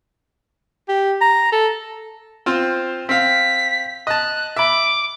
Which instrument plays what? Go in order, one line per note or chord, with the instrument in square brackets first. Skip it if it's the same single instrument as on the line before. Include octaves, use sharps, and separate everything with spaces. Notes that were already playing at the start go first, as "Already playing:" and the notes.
[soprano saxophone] G4
A#5
A4
[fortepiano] C4 F4 C5
[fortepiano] C4 F5 [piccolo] B6
[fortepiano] D#5 A5 [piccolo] F#6
[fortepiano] E5 B5 [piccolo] D6